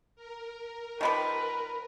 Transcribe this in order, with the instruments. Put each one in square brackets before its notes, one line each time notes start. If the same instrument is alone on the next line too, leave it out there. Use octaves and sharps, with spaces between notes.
[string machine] A#4
[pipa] D#3 F3 G3 [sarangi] B4 [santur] A5 B5